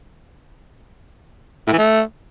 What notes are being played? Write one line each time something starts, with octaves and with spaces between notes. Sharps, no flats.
A2
E3
A3